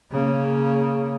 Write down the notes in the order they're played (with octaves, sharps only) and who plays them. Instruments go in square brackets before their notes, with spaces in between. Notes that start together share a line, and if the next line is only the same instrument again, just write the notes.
[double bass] C#3 A#3